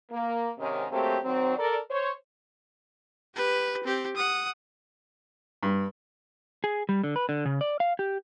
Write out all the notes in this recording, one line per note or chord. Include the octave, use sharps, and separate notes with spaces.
A#3
G#2 C3 D#3 C#4
F#3 A3 A#3 C4 G4
D#3 F#3 C4
A4 A#4 D5
C5 C#5
G4 B4
C4 G4
F#5 D#6
G2
G#4
G3
D3
B4
D3
C#3
D5
F5
G4